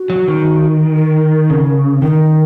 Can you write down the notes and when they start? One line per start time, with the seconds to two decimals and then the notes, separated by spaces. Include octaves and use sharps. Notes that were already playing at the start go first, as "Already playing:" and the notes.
Already playing: F#4
0.10 F#3
0.28 D#3
0.97 A#4
1.50 C#3
2.02 D#3 A#4